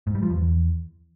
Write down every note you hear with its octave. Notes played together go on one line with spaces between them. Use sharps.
G#2
G3
F3
E2